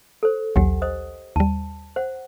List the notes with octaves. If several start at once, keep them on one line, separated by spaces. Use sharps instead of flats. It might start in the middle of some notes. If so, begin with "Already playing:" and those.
A4 C5
A#1 D#2 F#3 G4 F#5 G#5
C5 D#5 D#6
D#2 G3 A5
C5 F#5